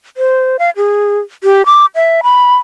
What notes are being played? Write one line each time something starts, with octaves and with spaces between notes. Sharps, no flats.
C5
F5
G#4
G4
D6
E5
B5